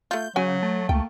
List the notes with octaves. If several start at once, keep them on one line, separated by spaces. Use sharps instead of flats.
A3 F4 G6
C#3 F#3 F#4 G#5
A3
C#2 A#3 G5